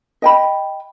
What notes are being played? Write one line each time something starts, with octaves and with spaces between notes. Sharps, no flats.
D#5 G5 B5